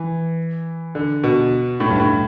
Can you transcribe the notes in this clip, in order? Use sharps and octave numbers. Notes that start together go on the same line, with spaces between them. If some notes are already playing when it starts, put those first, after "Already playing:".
Already playing: E3
D3
B2
A2
G2
A2